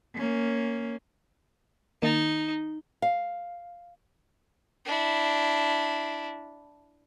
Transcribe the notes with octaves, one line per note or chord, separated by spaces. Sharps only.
A#3 C#4
D#3 A#3 D#4 A6
F5
D4 E4